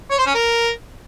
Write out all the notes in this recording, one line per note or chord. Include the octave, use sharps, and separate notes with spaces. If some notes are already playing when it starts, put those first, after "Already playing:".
C#5
C5
C#4
A#4